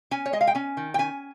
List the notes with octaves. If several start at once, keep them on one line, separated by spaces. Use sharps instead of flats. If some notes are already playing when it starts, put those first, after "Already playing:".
C#4 G#5
C#5
G#3 D#5
F5
G5
C#4 G#5
D#3
G5
C#4 G#5